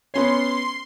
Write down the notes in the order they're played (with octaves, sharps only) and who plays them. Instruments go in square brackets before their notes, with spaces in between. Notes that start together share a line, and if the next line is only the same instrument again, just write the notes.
[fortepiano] B3 C#4 C#5 [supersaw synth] C6